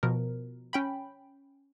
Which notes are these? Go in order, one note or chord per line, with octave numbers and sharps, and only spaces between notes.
B2 F3 A#4
C#4 G5 B5